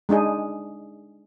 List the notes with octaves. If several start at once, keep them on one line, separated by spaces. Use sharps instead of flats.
G#3 D4 D#4 G#4